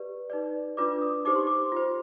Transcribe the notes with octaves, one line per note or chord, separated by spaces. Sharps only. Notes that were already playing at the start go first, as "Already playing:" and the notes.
Already playing: G4 B4 D5
D#4 B4 D5
D4 F4 B4 D5 D6
D#6
D#4 G4 C5 D6
C6
D6
F4 C5